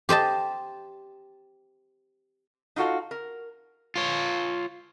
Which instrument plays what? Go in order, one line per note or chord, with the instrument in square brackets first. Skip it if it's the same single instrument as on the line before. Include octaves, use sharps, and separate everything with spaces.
[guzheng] G4 C5 D#5 A5
[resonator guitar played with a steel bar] D#4 F4 F#4 A4 F5
A#4
[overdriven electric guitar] F4 C#5